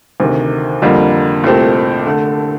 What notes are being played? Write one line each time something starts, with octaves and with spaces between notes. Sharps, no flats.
D2 C3 D#3
F2 D3 G3 A#3
C2 A#2 A3 C4 G4
D3 A3